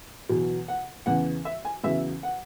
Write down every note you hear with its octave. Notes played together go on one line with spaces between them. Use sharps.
E2 B2 F#3
F#5
E2 C#3 E3 F#5
E5
G#5
E2 C#3 F#3 E5
F#5